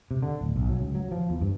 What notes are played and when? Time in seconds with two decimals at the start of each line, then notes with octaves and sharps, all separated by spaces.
0.11 C3
0.22 D3
0.41 D1
0.56 B1
0.69 F#3
0.81 C#2
0.95 F#3
1.12 F3
1.30 E2
1.41 G2